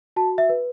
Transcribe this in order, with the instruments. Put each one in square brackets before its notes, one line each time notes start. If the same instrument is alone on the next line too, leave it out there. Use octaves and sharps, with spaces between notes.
[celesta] F#4 A5
E5
B4